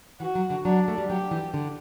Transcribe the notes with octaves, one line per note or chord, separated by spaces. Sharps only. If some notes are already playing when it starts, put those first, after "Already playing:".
E3 F#4
F#3
D3
F#3 D4
A3
G3
F#3 G4
E3
D3